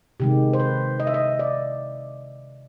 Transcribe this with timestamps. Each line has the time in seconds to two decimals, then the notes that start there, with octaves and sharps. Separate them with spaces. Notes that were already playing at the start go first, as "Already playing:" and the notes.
0.20 C3 D#3 G#3 G4
0.53 C5
0.60 B4
1.00 D#5
1.07 E5
1.14 D#5
1.39 D5